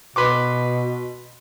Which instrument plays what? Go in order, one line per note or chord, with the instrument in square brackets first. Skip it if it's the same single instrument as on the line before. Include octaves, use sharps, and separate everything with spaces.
[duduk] B2 [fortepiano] B4 C6 D6